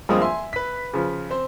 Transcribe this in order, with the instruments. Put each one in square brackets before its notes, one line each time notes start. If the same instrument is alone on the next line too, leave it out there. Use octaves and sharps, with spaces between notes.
[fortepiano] G2 G#3 D#6 [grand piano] F3 A#3 C4
[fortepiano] E5 [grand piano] G#5 C6
[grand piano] B4 B6
[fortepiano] C#3 F3
[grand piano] C4 C5